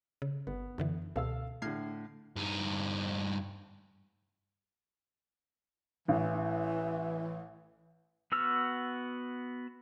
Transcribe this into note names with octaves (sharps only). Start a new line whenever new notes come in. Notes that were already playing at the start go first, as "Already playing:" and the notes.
C#3
G1 B3
F#2 D3 E3
C#2 B2 A4 F5 E6
A2 D3 F6 G#6 C7
G2 D#4
A1 E3
B3 F#4 E6 F6